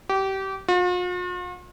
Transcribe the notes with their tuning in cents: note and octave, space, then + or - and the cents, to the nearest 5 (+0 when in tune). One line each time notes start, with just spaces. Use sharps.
G4 -25
F4 +45